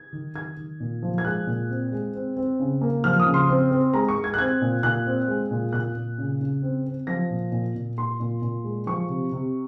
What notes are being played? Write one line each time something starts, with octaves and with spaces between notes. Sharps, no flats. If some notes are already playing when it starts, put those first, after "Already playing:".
Already playing: G#6
D#3
D#3 G#6
D#3
A#2
F3
G#6
G#3 F#6
A#2
C4
G#3
C4
C4
C#3
A#3
F3 F6
D#6
C#3
C6
C4
C4
G#3 A#5
C#6
G#3
G#6
F#6
C4 G#6
A#2
A#2 F#6
C4
G#3
A#2
A#2 F#6
A#2
C#3
C#3
C4
C4
F3 A#6
A#2
A#2
A#2
A#2 C6
A#2
A#2
G#3
F3 C#6
C3
C3